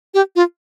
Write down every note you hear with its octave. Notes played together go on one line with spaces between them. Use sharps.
G4
F4